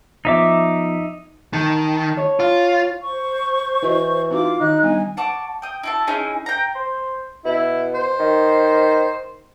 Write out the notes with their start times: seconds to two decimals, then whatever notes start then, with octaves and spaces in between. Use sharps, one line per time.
0.25 F3 B3 C4 D#4 E5 D6
1.53 D#3 A5
2.17 C#5
2.40 F4
3.02 C5 C#6
3.83 E3 E4 F#4 D#5
4.31 C4 D#4 F4 F#4 D6
4.61 D#3 D#4 F#6
4.83 G3 B3 D4 G#5
5.17 F#5 A5 C#6 D6
5.62 G5 D#6
5.83 E4 F#4 A5
6.07 C#4 D#4 E4 G#4
6.46 G5 A#5
6.75 C5
7.45 B2 E4
7.94 C5
8.19 D#3